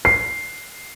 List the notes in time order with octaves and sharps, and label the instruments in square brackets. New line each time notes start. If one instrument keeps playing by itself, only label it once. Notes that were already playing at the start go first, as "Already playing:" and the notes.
[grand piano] C7